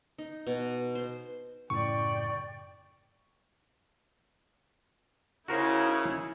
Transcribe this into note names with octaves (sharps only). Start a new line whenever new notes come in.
D#4
B2
C5
F#2 A2 C#3 D5 G5 C#6
C#3 D#4 E4 F#4 A#4 C5